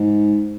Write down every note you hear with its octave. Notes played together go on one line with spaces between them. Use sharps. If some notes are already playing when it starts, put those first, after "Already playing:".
Already playing: G#2